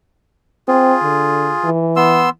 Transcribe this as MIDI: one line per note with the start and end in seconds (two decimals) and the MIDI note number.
0.68 0.95 60
0.68 1.70 65
0.68 1.70 68
1.03 1.54 50
1.64 2.28 52
1.96 2.30 59
1.96 2.30 84
1.96 2.30 88